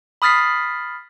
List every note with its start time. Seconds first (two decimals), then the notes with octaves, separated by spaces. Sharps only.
0.22 B5 D#6 F6 A6 B6 C7